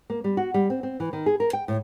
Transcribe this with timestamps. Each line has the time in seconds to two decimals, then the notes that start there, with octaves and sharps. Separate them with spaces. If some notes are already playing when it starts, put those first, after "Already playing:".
0.10 A#3
0.24 G3
0.37 F#4
0.54 G3
0.70 C4
0.83 C4
1.00 E3
1.13 D#3
1.26 G#4
1.40 A#4
1.53 G5
1.68 A2